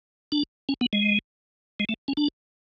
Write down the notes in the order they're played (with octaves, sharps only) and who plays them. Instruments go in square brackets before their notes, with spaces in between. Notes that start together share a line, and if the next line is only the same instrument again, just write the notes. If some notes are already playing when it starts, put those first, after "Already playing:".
[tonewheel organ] D4
C#4
B3
G#3
G#3
A3
C#4
D4